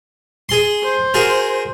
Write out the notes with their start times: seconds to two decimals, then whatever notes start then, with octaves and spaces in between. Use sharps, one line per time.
0.49 G#4 C6
0.83 C5
1.14 F#4 G#4 A#4